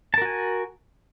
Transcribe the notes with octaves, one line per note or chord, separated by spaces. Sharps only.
F#4 A#4 G#5 A5